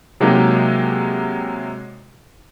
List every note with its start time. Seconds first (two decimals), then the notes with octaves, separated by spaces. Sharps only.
0.20 C3 F#3 G#3 A#3 D#4 G4